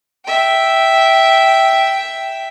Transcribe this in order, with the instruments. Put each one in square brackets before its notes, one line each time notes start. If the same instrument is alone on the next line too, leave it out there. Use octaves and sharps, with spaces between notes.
[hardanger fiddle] E5 G5